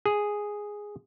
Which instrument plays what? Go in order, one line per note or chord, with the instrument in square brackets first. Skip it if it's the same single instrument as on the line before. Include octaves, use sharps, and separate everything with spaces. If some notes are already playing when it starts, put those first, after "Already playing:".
[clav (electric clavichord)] G#4